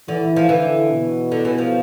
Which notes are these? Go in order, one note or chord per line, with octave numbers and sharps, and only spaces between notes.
D3 E3
F3
D3 E3
B2
D3
E3
F3